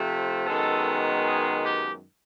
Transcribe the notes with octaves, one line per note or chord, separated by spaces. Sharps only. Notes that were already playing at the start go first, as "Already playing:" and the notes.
Already playing: C3 F3 A3
F#2 D#3 G#3 B3 A4
G#4
G4